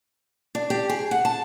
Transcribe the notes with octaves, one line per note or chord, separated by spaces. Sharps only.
D4
G4
G#4
F#5
A5